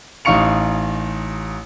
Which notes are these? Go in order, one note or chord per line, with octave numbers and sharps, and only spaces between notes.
A1 D#4 F5 C#6 C#7 F7